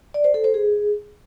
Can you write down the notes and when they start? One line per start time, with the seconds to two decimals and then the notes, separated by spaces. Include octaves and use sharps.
0.14 D5
0.24 C5
0.34 A4
0.44 C5
0.54 G#4